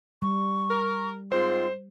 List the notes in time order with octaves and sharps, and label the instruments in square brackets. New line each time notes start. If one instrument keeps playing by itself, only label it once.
[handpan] G3 [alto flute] C#6
[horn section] A#4
[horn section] G#2 C4 C6 [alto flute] F4 [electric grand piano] C5